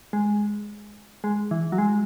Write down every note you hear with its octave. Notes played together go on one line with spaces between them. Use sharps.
G#3
G#3
E3
F#3
G#3